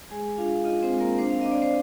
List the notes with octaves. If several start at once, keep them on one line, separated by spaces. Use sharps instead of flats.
G#3 G#4 G#5
D4 F4 F5
D#4 F4 D#5
C4 C5
G#3
A#3 A#4
C4 D4 C5
F5
D4 D#5
D5
C5